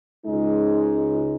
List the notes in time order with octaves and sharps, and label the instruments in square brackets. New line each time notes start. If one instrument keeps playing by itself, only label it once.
[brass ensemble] C#2 C#3 G#3 D#4